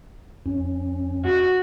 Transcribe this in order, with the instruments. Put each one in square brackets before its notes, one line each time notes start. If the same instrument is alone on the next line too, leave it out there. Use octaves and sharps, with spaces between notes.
[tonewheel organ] F2 C#4
[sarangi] F#4